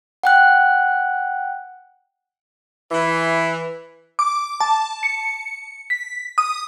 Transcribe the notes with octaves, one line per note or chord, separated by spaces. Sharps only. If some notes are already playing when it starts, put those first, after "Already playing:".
F#5 G5 F#6
E3
D6
A5
C#7
B6
D#6